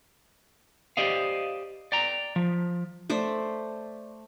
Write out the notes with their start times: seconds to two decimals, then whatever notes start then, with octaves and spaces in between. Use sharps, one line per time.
0.97 G4 C5 D5 D#5 F5
1.92 D5 G5 A#5
2.36 F3
3.10 A3 C5 D5